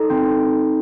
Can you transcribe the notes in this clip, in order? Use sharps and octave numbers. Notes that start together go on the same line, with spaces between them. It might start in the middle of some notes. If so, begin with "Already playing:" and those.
Already playing: D#4 A4
C4